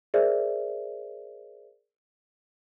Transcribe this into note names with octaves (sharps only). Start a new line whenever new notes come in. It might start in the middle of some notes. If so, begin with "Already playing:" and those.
G#4 A#4 C5 D5 E5